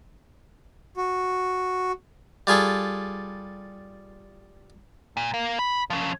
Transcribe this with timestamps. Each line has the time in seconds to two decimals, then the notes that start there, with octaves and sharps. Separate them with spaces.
0.97 F#4
2.47 G3 F4 G#4 A4
5.17 A#2
5.34 A#3
5.59 B5
5.90 F3 C#4